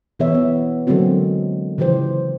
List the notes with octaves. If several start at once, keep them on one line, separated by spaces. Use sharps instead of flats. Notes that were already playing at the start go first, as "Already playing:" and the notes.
B2 E3 B3 G#4 C#5 E5
B3
D3 F#3 G#3 A#3 C4 F#4
C#3 E3 F3 G4 C5